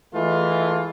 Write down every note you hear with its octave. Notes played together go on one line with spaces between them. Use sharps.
E3 G#3 A3 F4